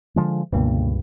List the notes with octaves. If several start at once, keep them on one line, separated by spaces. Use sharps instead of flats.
D3 F3 G#3
C#2 G2 B2 D3 A#3